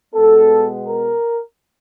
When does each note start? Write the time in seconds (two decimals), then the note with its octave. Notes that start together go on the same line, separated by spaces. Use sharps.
0.14 B2 G#3 B3 A4
0.88 A#4